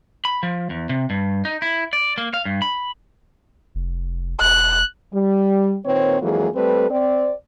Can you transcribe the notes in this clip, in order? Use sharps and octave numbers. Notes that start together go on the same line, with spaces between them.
B5
F3
E2
C3
G2
D#4
E4
D5
A#3
F5
G2
B5
F1
E1 F#6
G3
A#2 D#3 C4 B4 C#5
F2 E3 F#3 G#3 A#3 G#4
G3 A3 C4 A4 B4
C4 D5